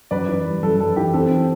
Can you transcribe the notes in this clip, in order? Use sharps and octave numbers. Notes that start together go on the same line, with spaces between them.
F#2 B4 D5
E3
G3
F#2 A4
F#2 A4
E3 G4
C4 A4
E3